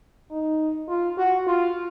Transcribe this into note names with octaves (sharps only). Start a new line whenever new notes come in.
D#4
F4
F#4
F4